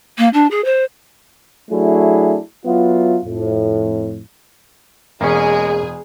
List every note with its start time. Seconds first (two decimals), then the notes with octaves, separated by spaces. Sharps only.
0.18 A#3
0.34 D4
0.51 G#4
0.65 C5
1.71 F#3 A3 D4 E4 F#4 G#4
2.65 F#3 B3 E4 F4
3.25 F2 A2
5.21 E1 G#3 A#3 C#4 G#4